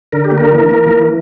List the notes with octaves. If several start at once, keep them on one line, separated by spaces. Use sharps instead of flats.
D3 A#4
G4
A#3
A#4
E3
A#3
E3